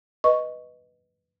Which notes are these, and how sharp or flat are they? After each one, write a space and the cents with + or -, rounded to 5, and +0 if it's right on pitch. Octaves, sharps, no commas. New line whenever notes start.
B4 +0 D#5 +0 C#6 +0